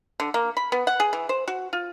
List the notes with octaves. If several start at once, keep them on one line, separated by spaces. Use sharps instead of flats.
D3
A#3
B5
B3
F#5
G#4
E3
C5
F#4
F4